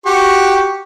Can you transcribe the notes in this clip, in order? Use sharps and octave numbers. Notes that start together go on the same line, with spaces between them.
F#4 G4 C#6